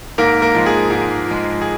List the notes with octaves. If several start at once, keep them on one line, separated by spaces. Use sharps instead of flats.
G#2 A#3 A#4
A#3 A#4
F3 G#3
G#4
G#2 G#4
F3 G#3
G#4